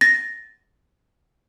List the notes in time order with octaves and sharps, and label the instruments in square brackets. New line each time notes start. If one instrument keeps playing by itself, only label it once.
[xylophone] A6 A#6